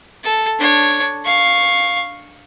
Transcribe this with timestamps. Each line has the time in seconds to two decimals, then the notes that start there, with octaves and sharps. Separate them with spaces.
0.23 A4
0.59 D4 C#5
1.25 F5 C#6